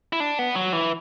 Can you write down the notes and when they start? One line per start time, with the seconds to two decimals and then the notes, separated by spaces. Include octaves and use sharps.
0.13 E4
0.20 D4
0.39 B3
0.55 F#3
0.73 E3